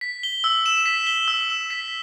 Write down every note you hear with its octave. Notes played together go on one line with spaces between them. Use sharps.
B6
G7
E6
E7
B6
G7
E6
E7
B6